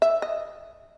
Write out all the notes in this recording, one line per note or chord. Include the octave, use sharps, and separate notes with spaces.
E5
D#5